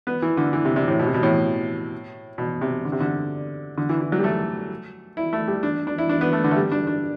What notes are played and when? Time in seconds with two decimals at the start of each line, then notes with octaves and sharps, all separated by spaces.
0.07 B3
0.22 E3
0.37 D3
0.53 E3
0.65 C3
0.76 C3
0.88 A2
0.99 B2
1.06 C3
1.14 B2
1.23 A2
2.38 B2
2.61 C3
2.85 D3
2.92 C3
3.00 D3
3.78 D3
3.89 E3
4.01 E3
4.12 F#3
4.19 G3
4.24 A3
5.17 E4
5.33 A3
5.48 G3
5.63 D4
5.87 D4
5.98 E4
6.09 D4
6.21 B3
6.33 A3
6.44 D3
6.51 A3
6.56 G3
6.72 D4
6.87 D4